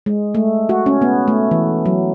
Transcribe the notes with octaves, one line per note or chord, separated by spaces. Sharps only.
G#3
A3
F#4
C#4
B3
A3
E3
F#3